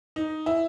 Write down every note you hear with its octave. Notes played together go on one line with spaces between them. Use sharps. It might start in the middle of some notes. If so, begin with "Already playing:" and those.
D#4
E4